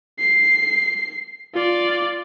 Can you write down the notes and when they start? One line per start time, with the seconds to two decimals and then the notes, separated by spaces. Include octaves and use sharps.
0.19 C7
1.54 F4 D5